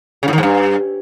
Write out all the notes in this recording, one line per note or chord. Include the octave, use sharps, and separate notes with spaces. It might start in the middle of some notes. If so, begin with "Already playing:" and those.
C#3
A2
D#3
G#2
G2